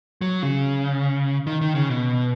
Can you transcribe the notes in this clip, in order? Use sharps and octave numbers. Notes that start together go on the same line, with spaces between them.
F#3
C#3
D#3
D#3
C#3
B2